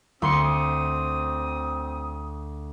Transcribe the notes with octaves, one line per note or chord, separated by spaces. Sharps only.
D2 C4 C6 D#6 C#7